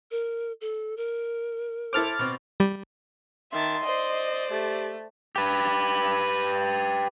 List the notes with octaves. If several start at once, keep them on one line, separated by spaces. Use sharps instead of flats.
A#4
A4
A#4
E4 A4 C5 D6 F6 A6
B2 C4
G3
D#3 E5 A5 C6
C5 D5 D#5
A3 G4
G4 B4